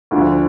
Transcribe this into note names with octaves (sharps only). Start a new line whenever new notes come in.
D2 D3 F3